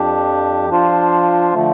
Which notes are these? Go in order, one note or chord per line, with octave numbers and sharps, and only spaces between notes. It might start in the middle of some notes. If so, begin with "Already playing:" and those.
Already playing: F2 F3 D4 G4
F3 D4 F4 C5
D3 F3 A3